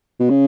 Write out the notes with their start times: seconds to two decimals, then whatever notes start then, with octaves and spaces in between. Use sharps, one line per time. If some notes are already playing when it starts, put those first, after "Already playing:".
0.20 B2
0.30 C#3